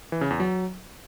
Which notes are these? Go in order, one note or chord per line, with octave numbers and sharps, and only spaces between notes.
E3
C#3
E2
F#3